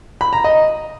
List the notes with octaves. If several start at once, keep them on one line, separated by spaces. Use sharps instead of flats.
B5
A#5
D#5